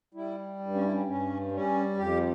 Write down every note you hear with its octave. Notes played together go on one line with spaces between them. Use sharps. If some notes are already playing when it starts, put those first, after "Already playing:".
G3 E4
G2
C#4
E4
C#4
G2 C#4
G3 C#4
F2 G4